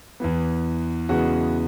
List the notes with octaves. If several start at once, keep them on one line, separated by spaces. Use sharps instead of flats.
E2 E3 B3
E2 C#3 G#3 B3 F#4